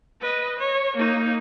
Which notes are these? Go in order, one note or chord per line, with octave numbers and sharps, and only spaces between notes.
B4 D#5
C#5
A#3 D#4